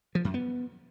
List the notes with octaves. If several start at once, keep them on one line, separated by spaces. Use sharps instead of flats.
F3
F#2
B3